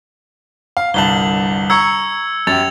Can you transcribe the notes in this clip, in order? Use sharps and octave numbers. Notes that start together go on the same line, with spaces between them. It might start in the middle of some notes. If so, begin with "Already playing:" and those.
F5
G1 C2 A5 F#7 G7
A#5 C#6 E6 G#6 C#7
F#2 G4 G#6 A6 F7